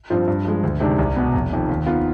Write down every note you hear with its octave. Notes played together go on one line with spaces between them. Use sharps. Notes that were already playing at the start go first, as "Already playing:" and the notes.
G2 F3 C4 F4
G2
F3 G#3
D2
C3 D#3 G#3 D4
C2
B2 B3
F1
F2 D#3
D#2
D#3 B3 F4